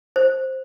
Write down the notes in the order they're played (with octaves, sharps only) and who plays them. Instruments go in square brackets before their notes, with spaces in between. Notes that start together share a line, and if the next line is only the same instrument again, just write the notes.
[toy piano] C5